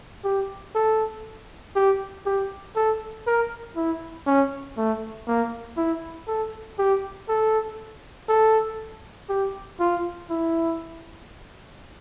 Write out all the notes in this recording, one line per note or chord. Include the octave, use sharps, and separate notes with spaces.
G4
A4
G4
G4
A4
A#4
E4
C#4
A3
A#3
E4
A4
G4
A4
A4
G4
F4
E4